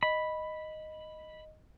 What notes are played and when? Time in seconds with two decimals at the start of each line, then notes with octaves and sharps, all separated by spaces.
0.03 D#5 B5